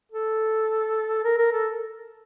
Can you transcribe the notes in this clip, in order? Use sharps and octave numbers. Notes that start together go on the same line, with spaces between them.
A4
A#4
A#4
A4